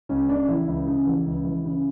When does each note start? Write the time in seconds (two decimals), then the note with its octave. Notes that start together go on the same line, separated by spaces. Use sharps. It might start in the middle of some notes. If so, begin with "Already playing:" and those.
0.09 C#2 C#4
0.29 C#3 D4
0.48 E3 E4
0.68 C#2 E4
0.87 C#3
1.07 E3
1.26 C#2
1.45 E3
1.65 C#3